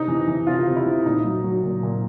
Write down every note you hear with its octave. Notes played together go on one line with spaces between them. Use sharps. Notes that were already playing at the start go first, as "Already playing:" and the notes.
Already playing: C3 D#4
E3
E3
C3 F4
C3
E4
E3
A#2 D#4
F#3
F#3
A#2
A#2